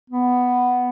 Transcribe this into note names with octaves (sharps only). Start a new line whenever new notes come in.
B3